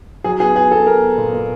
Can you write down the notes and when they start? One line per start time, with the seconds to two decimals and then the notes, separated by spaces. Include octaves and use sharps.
0.24 F#3 G#4
0.40 B3 G#4
0.55 B3 G#4
0.72 B3 A4
0.86 B3 A#4
1.03 B3
1.18 A#2
1.34 A#2